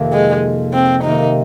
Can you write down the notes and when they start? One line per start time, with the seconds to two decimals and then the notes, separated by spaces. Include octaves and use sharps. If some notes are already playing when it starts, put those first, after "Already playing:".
Already playing: F2 C3 D#3 A#3
0.13 G#3
0.74 C4
1.04 C3 D#3 A#3 D#4